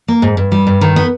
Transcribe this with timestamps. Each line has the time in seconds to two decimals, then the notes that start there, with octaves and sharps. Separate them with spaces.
0.08 A#3
0.22 G#2
0.37 G2
0.52 G3
0.67 G2
0.81 D#3
0.96 B3